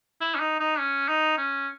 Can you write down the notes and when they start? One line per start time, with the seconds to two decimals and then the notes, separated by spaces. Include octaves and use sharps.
0.21 E4
0.35 C#4
0.40 D#4
0.59 D#4
0.79 C#4
1.08 D#4
1.37 C#4